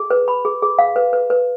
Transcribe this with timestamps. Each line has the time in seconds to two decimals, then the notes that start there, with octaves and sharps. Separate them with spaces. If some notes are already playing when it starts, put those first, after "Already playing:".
Already playing: G#4
0.11 B4
0.28 B5
0.45 G#4
0.62 G#4
0.79 F5
0.96 B4
1.13 B4
1.30 B4